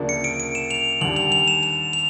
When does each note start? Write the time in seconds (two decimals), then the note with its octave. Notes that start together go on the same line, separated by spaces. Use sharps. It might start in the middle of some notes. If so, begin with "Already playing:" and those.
Already playing: D2 C#3 F3 A#3 D4
0.09 C#7
0.24 D7
0.40 D7
0.55 E7
0.71 F7
1.01 D#2 D3 G3 F#7
1.16 F7
1.32 F7
1.48 E7
1.63 E7
1.93 F7